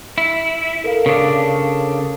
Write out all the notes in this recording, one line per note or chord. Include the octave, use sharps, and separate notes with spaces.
E4
A4 A#4 F5
C#3 D4